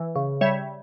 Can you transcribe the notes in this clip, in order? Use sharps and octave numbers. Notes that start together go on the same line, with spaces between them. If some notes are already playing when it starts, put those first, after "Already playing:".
Already playing: E3
C#3
G3 C#5 E5